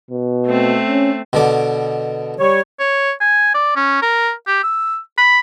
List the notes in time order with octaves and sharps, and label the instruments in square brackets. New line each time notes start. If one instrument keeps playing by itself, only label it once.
[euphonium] B2
[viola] A3 C4
[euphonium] C#4
[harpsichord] B2 D3 D6
[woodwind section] G3 C#5
[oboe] C#5
G#5
D5
C#4
A#4
G4
E6
B5